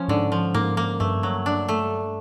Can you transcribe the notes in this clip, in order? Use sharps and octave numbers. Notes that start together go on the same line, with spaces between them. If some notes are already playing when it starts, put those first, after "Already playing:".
Already playing: F3 C#4
G#2 D3
F3
G#2 A#3
A#3
G2 A3
F#3
D4
A3